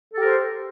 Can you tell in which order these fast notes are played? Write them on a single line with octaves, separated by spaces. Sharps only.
A4 G4 A#4 C5